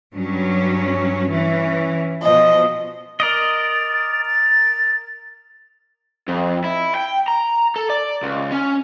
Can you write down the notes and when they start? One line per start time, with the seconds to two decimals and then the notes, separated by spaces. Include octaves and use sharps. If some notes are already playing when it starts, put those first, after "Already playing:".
0.13 G2 F#3 C#4
1.30 E3 C#4
2.23 B2 F3 D#5
3.20 A#4 D5 D#5 A6
4.26 A6
6.28 F2
6.64 E4
6.95 G5
7.28 A#5
7.76 A4
7.90 D5
8.23 C#2
8.52 C#4